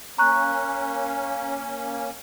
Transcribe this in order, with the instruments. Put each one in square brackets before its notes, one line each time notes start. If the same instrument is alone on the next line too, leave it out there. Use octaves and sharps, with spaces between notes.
[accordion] A#3 C#4 [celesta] A#5 C#6 F#6